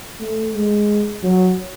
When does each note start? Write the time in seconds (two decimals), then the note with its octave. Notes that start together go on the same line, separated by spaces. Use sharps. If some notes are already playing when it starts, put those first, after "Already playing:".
0.20 A3
0.54 G#3
1.23 F#3